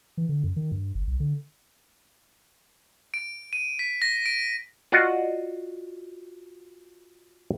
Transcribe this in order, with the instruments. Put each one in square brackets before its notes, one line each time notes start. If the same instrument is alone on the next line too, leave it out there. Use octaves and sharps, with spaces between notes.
[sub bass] E3
D3
F#2
D#3
G2
G1
B1
D3
[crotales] D7
D#7
B6
A#6
D7
[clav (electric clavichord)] F4 F#4 D5 D#5 F#5